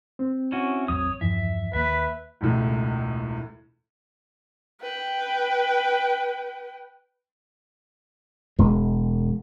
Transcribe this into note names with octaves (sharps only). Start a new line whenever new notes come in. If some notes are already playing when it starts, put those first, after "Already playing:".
C4
C#4 E4 F#4
A1 E2 F#3 C#5 D#6
E2 G2 E3 F3 E5
D#2 A#3 B4 E5
E1 C#2 A2
B4 G5
E1 G#3